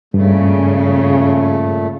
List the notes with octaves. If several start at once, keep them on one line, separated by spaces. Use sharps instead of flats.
G2 A#2 C#3 A3